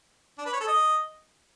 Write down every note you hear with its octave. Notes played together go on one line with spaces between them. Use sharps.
D4
B4
C#5
A4
D#5